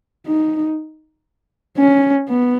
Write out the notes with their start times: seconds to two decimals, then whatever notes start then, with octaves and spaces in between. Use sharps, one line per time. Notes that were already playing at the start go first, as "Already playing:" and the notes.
0.27 D#4
1.78 C#4
2.28 B3